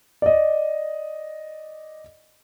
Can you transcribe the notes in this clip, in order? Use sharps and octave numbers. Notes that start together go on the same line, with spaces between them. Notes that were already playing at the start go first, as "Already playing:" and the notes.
D5 D#5